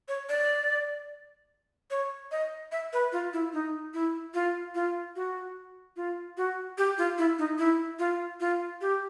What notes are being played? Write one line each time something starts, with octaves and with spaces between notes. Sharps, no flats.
C#5
D5
C#5
D#5
E5
B4
F4
E4
D#4
E4
F4
F4
F#4
F4
F#4
G4
F4
E4
D#4
E4
F4
F4
G4